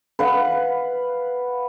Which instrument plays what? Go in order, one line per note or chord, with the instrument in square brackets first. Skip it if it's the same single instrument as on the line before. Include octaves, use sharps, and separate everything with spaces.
[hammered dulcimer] B4 F5 F#5